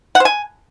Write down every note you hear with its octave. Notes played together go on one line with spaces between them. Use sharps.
F#5
C5
G#5